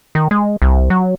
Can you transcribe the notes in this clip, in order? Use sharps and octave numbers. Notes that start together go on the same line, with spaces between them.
D#3
G#3
C2
F#3